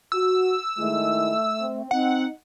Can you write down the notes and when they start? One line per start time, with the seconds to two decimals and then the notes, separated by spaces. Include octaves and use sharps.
0.12 F#4 E6
0.78 D#3 G#3 A3 E4
1.59 C4
1.91 C4 D#4 F#5